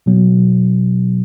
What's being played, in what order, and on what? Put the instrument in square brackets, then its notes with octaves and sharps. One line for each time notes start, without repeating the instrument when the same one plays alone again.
[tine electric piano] B2 F#3 B3